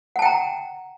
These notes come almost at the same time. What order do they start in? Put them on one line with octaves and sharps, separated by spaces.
F#5 A5 G5 A#5